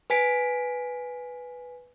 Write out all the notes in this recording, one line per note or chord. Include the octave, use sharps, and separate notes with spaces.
B4 G#5 B6 D7